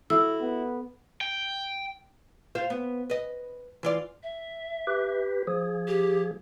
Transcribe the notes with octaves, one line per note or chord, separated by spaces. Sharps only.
E4 F#4 A4 E6
B3
G5
F4 C5 F5
B3
B4 D#5
E3 F4 D5
E5
G4 B4
F3 G#4
G4